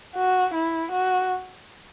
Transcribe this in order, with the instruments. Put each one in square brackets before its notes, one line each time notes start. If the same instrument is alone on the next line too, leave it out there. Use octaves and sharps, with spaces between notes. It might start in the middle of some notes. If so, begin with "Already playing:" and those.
[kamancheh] F#4
E4
F#4